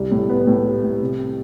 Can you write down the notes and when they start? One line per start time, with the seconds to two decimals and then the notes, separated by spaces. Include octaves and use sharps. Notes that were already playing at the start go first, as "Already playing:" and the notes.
Already playing: C2 G3
0.11 A2
0.29 B3
0.47 A2
0.65 G3
0.83 A2
1.01 C3